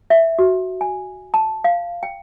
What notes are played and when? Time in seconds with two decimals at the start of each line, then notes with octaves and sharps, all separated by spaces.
0.10 E5
0.39 F#4
0.81 G#5
1.34 A5
1.64 F5
2.03 G5